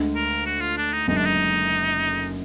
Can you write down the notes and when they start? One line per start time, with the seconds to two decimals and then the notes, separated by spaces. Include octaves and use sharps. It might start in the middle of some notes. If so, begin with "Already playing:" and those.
Already playing: D2 D3 G#3
0.16 A#4
0.46 F#4
0.61 F4
0.77 D4
0.93 D#4
1.08 F#1 F#2 D3 G#3 D#4
1.16 D4
1.25 D#4